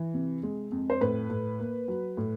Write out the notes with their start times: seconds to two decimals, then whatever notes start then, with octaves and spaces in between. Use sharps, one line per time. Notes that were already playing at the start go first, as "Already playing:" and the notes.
Already playing: E3
0.14 C3
0.43 G#3
0.72 F2
0.90 C5
1.01 A2 B4
1.30 A2
1.59 A#3
1.88 F#3
2.17 A2